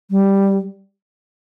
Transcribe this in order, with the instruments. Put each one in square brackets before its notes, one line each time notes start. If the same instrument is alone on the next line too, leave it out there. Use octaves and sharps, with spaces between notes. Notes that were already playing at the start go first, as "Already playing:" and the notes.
[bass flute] G3